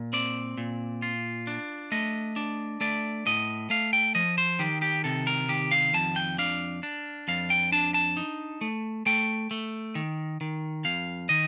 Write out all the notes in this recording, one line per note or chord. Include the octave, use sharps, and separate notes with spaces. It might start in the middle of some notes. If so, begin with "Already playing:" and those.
Already playing: A#2
C4 D5
A#2
F4
D4
A3 D#5
D4
A3 D5
A2 D#5
A3 F5
G5
F3 D#5
C5
D#3 G4
G4
C3 A4
A#4
D#3 G4
F5
F2 A5
G5
D4 F5
D4
F2 F5
G5
D4 A5
A5
D#4
A3
A3 G5
A3
D#3
D#3
F2 F5
D#3 D#5